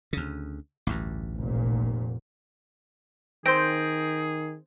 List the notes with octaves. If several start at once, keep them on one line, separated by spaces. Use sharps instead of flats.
D2 C#3
A1 D2 G2
F1 A#2
D#3 C4 G#4 C5 G6 A#6 D7